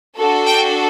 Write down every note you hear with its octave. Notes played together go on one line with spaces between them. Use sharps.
D4 F#4 A4
G5